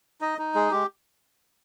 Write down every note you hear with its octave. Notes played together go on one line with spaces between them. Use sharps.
D#4 D#5
D#4
G#3 G#4
G#3 G4